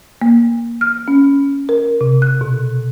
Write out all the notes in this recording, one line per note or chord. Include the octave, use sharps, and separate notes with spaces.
A#3
F6
C#4
A#4
C3
F#6
B2